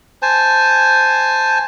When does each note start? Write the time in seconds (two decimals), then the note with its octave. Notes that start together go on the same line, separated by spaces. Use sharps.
0.22 C5 G#5 A5